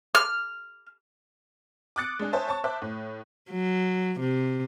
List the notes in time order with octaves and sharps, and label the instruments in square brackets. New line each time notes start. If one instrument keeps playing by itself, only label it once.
[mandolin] F6
[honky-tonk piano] D6 D#6 F#6 A6 C#7 D7
G#3 D4 G#4
C5 C#5 E5 G#5 A5
C#5 A5 C#6
C5 E5 A5 D6 F#6
A2
[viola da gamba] F#3
C3